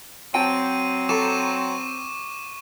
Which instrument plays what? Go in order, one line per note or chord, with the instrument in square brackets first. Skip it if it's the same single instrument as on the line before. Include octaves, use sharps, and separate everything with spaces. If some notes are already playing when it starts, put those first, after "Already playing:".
[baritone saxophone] F#3 [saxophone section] C4 [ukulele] G5 A5 [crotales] D#7
[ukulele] A4 A#5 [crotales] C#6 D6 E7